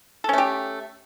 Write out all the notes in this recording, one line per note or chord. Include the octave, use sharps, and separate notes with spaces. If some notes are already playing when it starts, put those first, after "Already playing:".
A3 C#4 G4 A4